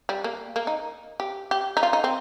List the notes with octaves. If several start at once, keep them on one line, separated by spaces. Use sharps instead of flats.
G3
A#3
A#3
D#4
G4
G4
D#4
F4
D#4
C4